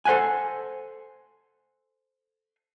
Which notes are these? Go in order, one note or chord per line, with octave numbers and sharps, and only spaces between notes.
A4 C5 E5 F#5 G#5